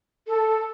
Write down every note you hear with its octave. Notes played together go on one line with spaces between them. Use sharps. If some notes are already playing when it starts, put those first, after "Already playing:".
A4